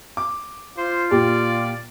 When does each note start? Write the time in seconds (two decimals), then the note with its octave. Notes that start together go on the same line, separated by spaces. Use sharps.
0.17 D6
0.78 F4 C5
1.11 A#2 G4 D5